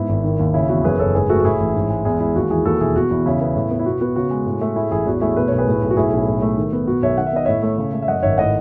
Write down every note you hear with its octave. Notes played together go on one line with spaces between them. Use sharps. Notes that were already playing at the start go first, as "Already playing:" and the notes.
Already playing: G#2 B3 E4
G#1
D#3
D#2
C#3 E4
E2 F#4
F#2 G#4 B4
F#1 A4 C#5
G#2 G#4 B4
A3 F#4 A4
F#4
A2 E4 G#4
A1
G#2
G#3
E2 E4 G#4
G#3 E4
D#2 F#4
E3 E4 G#4
D#2 F#4 A4
E1 E4 G#4
B2 F#4
E2 E4
C#3 E4
B3
A2
B3
E4
B2 F#4
B3 F#4
C#3 F#4
G#3
A2
A3
A2 E4 G#4
A1 E4 G#4
E2 F#4
A3 E4 G#4
B2 B4
B1 C#5
G#4 B4
A2
B1
F#4
A2 E4 G#4
B1
A2
A3
D#3
B3
B2 F#4
B1 C#5 E5
D#3 F#5
E5
B3 D#5
A2 C#5 E5
A3
C#3
A3
E5
F#2 D#5 F#5
G#1 C#5 E5
A2 D#5 F#5